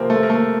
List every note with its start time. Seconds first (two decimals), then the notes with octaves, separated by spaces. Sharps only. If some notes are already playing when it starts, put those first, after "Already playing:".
Already playing: F2 C3 F3 A#3 C4
0.10 A3
0.23 A#3
0.30 A3